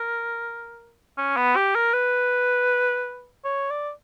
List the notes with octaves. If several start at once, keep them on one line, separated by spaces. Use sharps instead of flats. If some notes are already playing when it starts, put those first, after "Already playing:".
Already playing: A#4
C#4
B3
G4
A#4
B4
C#5
D5